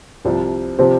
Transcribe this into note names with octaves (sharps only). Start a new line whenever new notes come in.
C2 C3 F3 C4
C3 F3 C4 G4 C5